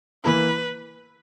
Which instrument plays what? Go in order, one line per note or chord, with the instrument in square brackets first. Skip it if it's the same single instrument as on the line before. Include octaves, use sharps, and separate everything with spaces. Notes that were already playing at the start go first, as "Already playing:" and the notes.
[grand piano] E3 A#3 E4 [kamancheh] B4